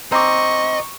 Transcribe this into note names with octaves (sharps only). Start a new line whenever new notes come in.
C4 D#5 A#5 C#6 D6